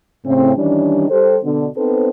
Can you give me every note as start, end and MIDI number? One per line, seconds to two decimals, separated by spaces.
0.24 0.53 45
0.24 0.53 49
0.24 0.53 60
0.56 1.07 51
0.56 1.07 52
0.56 1.07 55
0.56 1.07 61
0.56 1.07 62
1.10 1.37 55
1.10 1.37 67
1.10 1.37 69
1.10 1.37 72
1.42 1.67 47
1.42 1.67 50
1.75 2.10 59
1.75 2.10 60
1.75 2.10 63
1.75 2.10 69
1.75 2.10 71
1.75 2.10 72